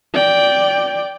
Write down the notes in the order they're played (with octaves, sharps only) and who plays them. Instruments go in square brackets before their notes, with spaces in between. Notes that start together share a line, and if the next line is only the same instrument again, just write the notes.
[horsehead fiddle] D5 G5